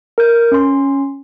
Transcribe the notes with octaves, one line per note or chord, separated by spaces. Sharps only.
A#4 G6
C#4 C6